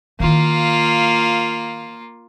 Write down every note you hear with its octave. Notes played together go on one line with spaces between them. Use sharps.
D#3 A#3 E4 F4